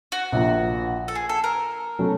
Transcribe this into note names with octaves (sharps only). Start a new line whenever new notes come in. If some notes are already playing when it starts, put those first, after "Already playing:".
F#4
A#1 A#2 F3 A#3
A4
G#4
A4
A#4
B2 F#3 A3 C#4